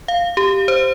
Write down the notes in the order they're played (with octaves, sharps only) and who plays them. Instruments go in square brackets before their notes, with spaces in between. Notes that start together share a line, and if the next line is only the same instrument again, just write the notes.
[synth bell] F5
G4
C5